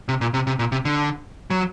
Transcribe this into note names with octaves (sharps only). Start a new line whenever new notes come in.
C3
A#2
C3
C3
A#2
C3
D3
F#3